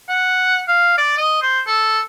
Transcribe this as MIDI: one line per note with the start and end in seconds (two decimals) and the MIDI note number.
0.09 0.62 78
0.68 0.96 77
0.98 1.15 74
1.17 1.40 75
1.42 1.61 72
1.67 2.00 69